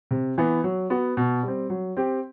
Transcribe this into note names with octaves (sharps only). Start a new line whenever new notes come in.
C3
E3 B3
F#3
B3 F#4
B2
G3 C4
F#3
C4 G4